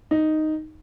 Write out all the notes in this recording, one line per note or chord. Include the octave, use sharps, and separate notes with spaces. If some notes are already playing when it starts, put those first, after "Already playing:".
D#4